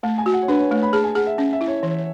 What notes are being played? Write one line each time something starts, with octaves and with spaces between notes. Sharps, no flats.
A3 A5
G#5
F#4
F#5
C#5
D4 B4
C#5
A3 C#5
B5
G#4 A5
G#5
G#4 F#5
E5
C#4
E5
E4
C#5
E3